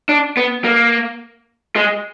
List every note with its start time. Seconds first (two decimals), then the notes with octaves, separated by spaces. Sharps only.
0.09 D4
0.37 B3
0.64 A#3
1.76 G#3